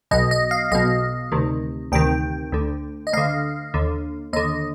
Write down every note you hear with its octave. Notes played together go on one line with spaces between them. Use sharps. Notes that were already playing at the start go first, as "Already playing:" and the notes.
B1 B2 D#5
D#5
F5
B1 B2 D#5
D2 C3 D#3
D2 C3 D#3 G5
D2 D3
D#5
D2 D3 F5
D#2 D3
D#2 D3 D#5